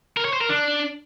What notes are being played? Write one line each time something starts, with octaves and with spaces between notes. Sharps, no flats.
A#4
C#5
C5
A#4
D4